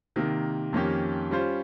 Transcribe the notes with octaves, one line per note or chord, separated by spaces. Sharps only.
C3 D#3 A#3
F2 D#3 A#3 C#4 G4
G3 C#4 F4 C5